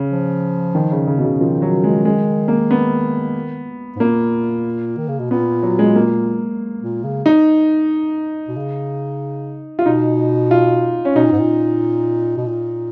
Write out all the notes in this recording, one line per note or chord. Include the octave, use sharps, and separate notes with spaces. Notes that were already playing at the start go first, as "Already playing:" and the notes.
Already playing: C#3
F3
D#3
C#3
C#3
B2
C#3
D#3 F3
F#3
G#3
G#3
A#3
B3
G#2
A#2 A#3
D#3
C#3
B2
A#2 B3
F#3
G#3
A#3
A#2
C#3
D#4
B2
C#3
F4
B2 D#4
F4
C#4
B2 D#4
A#2
G#2
A#2
B2
A#2